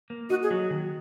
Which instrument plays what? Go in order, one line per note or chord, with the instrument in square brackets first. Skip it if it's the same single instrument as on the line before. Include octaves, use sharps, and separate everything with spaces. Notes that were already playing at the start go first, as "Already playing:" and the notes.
[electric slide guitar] A#3
[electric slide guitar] D#4 [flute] F#4
[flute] G#4
[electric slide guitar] F#3
D#3